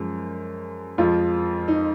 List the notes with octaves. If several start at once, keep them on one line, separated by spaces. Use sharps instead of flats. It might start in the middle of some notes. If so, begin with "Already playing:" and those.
Already playing: F#2 F3 G#3
F2 F3 G#3 F4
D#4